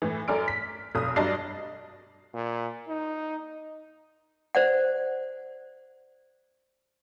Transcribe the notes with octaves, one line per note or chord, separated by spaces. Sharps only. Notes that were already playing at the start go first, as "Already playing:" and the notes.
A2 E3
F#2 A4 D5 G#5 F6 D7
B6
F1 B1 D#6
G2 F#3 D4 D#5 A5 C7
A#2
D#4
C5 D5 F#5